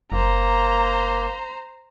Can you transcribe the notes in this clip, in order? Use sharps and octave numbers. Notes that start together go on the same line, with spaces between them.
F#1 A#3 C5 A#5